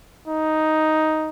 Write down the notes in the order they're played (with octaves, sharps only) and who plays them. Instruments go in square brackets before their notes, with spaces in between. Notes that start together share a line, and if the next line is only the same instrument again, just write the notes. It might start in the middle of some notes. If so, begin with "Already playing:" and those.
[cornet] D#4